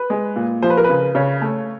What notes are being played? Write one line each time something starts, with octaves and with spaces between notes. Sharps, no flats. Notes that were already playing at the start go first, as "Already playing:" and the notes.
Already playing: B4
G#3
A#2
F3 C5
B4
A#4
C#3 B4
C#3 C#5
A3